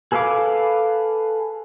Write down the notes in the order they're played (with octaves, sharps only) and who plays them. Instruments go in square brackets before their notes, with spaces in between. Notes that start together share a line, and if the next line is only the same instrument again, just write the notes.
[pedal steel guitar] G#4 A4 B4 F5 D6